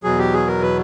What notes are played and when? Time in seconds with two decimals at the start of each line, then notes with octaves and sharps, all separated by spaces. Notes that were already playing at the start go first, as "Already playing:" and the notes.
0.04 E2 B2 F#3 G#4
0.19 G4
0.33 G#4
0.47 A#4
0.62 B4